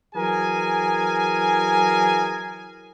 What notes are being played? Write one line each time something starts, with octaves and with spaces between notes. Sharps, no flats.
E3 F#3 G#4 A#4 G#5